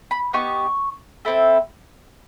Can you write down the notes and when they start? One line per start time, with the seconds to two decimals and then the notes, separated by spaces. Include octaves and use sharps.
0.11 B5
0.33 B3 D#4 G4 C#6
1.25 C4 E4 A4